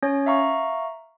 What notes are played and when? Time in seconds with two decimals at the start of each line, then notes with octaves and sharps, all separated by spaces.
0.03 C#4 C#5
0.26 E5 F5 A#5 C#6